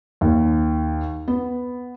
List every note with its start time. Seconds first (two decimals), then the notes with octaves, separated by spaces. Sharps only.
0.21 D#2
1.28 B3